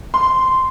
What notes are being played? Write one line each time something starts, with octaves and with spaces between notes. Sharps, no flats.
C6